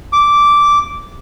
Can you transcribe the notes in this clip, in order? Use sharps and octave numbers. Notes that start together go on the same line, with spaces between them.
D6